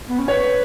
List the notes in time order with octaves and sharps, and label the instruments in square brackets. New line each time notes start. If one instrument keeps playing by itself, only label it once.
[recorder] B3
C#4
[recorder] B4 [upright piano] C#5